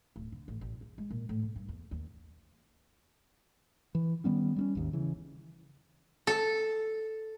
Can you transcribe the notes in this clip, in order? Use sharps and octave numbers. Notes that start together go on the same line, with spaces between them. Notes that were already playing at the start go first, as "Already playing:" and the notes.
D1
D3
A1
A1
E2
G#3
A#2
A2
E1
G2
E2
D#2
E3
D#3 G3 B3 C#4
G3 C4 C#4
G#1 D#2
C#3 E3
A4